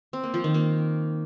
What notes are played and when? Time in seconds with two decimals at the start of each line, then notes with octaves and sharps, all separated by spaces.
0.13 C4
0.23 A#3
0.34 F3
0.44 D#3
0.54 A#3